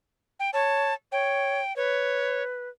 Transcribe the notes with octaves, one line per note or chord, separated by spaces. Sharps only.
G5
C#5 A5
C#5 G5
B4 C#5